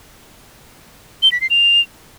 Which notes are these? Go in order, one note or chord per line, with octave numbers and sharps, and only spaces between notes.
G7
B6
C7
F7